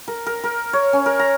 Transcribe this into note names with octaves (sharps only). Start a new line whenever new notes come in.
A#4
A#4
A#4
C#5
C#4
A#4
A#5